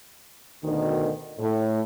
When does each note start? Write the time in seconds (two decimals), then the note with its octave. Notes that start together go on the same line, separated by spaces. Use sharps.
0.62 D2 B2 D#3
1.38 A2